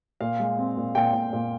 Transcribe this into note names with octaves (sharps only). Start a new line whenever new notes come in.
A#2 F5
G#3
C4
A#2
A#2 G5
A#2
A#2